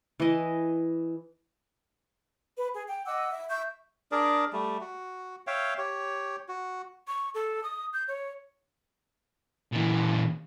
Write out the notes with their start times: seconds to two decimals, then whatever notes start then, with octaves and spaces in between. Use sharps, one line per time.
0.20 E3 D#5
2.55 B4
2.72 G#4
2.88 G5
3.06 D#5 F#5 D6 E6
3.32 E5
3.49 E5 C#6 G6
4.12 D4 G#4 A#4 D5
4.53 G3 A3
4.81 F#4
5.47 C#5 E5 F5 G5
5.78 G4 C#5
6.48 F#4
7.07 C#6
7.35 A4
7.63 D#6
7.93 G6
8.08 C#5
9.73 A#2 E3